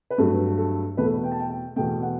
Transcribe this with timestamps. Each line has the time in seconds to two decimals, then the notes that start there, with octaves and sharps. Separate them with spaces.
0.10 B4
0.18 G2 F#3 A3 A4
0.58 A4
0.97 E2 B2 A3 B4
1.05 A4
1.14 B4
1.24 G5
1.32 A5
1.39 G5
1.50 G5
1.76 E2 B2 A3 G5
2.02 F#5